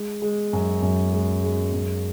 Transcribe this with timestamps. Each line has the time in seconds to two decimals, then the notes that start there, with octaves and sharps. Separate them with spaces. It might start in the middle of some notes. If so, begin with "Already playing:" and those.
Already playing: G#3
0.22 G#3
0.53 F#2
0.82 F#2
1.12 G#3
1.43 G#3
1.73 F#2